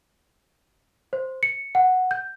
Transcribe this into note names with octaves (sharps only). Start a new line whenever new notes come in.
C5
C#7
F#5
G6